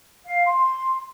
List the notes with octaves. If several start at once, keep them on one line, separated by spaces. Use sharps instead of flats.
F5
C6